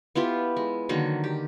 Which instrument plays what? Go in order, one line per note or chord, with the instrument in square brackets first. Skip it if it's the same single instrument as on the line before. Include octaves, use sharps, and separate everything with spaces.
[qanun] B3 E4 F4 G4
G#3
D3 D#3 F#3 A#3
G4